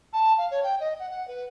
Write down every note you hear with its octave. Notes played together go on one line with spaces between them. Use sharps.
A5
F5
C#5
G5
D#5
F#5
F#5
B4